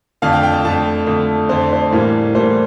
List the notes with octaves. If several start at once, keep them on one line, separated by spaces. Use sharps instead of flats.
F2 D3 A3 F5
G5
G5
A5
F2 D3 A3 A5
F2 D3 A3
F2 D3 A3 C5
D5
C5
A2 E3 G3 A#3
A2 E3 G3 A#3 C5